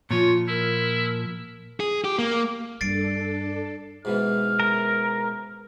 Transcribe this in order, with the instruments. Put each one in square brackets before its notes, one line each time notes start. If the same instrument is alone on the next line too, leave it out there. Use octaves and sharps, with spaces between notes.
[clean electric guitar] A#2 F3 [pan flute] F4 [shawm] C#5
[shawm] E4 [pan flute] A#4
[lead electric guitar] G#4
G4
A#3
[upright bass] G2 G3 [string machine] D4 A4 [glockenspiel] A6 C7 D7
[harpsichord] G#2 B2 E3 [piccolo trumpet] F6
[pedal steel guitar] A#4